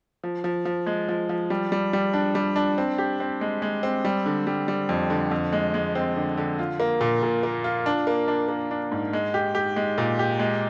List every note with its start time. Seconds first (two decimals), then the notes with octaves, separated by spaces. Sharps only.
0.24 F3
0.44 F3
0.65 F3
0.87 G#3
1.09 F3
1.29 F3
1.50 G3
1.72 G3
1.93 G3
2.13 D4
2.35 G3
2.56 D4
2.78 C4
2.98 G4
3.20 C4
3.41 G#3
3.62 G#3
3.83 C4
4.05 G3
4.26 D3
4.47 G3
4.68 G3
4.89 F2
5.10 D3
5.31 F2
5.53 G#3
5.74 G#3
5.95 C4
6.16 D3
6.37 D3
6.59 F4
6.80 A#3
7.01 A#2
7.23 A#2
7.43 A#3
7.64 F4
7.86 D4
8.07 A#3
8.28 D4
8.49 A#3
8.71 D4
8.92 G#2
9.13 G#3
9.34 G4
9.55 G4
9.76 G#3
9.98 A#2
10.19 G4
10.39 G#3